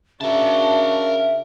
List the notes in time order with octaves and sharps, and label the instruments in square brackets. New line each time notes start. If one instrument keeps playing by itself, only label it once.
[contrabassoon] C#3 [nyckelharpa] D4 F#4 [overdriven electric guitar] A#4 A5 [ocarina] E5